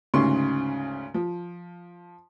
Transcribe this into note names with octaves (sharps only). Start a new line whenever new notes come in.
D2 G#2 C#3 C6 C#6
F3